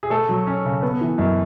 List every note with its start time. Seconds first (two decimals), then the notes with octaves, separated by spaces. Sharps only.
0.03 G#4
0.10 A3 A4
0.29 F#3
0.47 C#4
0.65 C#3
0.82 B3
1.01 E3
1.18 F#2